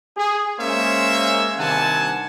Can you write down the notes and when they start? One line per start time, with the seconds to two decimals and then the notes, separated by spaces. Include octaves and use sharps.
0.17 G#4
0.58 G#3 A#3 C#4 C5 C#5 E5
1.58 G2 C3 D#3 F#5 G#5 A5